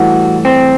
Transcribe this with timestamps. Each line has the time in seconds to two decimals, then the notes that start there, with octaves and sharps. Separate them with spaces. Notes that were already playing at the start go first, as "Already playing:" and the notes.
Already playing: A2 E3 G3 F#4
0.45 C4